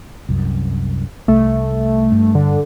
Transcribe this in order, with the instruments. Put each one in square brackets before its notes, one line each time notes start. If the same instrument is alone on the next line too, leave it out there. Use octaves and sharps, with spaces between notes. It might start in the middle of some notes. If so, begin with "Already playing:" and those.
[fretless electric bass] C2 F#2
[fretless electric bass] C2 [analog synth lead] A3
[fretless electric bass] G2
[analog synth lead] D3